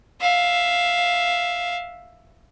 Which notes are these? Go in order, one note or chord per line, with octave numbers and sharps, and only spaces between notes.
E5 F5